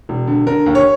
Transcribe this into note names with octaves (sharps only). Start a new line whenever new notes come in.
E1
D3
D3 A#4
D#2
C#5